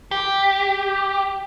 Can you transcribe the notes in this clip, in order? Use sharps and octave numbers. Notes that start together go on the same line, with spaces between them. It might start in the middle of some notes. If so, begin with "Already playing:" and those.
G4